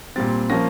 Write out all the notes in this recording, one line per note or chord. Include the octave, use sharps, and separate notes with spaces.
A#2 G3 C4 A6
F3 A#3 C#4 A#6